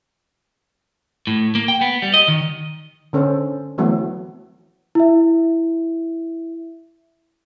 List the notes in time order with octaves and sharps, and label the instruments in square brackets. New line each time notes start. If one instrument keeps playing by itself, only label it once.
[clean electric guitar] A2
A#3
G5
B3
G3
D#5
D#3
[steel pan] D3 C#4 A4 C5
E3 F#3 A3 B3 C4
[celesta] E4 E5